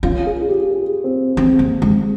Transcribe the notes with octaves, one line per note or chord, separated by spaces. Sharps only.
C#4 F4
G#4
F4
G4
G#4
C4
C4
A#3
G#3